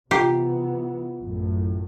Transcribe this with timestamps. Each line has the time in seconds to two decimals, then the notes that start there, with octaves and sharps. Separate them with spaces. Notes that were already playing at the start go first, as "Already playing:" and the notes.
0.11 C3 E3 B3 F4 G4 A#5
1.20 A1 F#2 A2